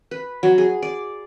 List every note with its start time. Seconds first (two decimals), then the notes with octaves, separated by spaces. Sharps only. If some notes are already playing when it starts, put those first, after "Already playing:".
0.11 B4
0.43 F#3
0.58 G#4
0.82 D5